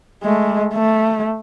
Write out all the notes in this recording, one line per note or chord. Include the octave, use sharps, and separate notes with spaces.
G#3 A3
A3